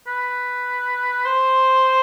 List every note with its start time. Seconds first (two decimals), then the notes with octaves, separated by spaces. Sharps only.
0.07 B4
1.25 C5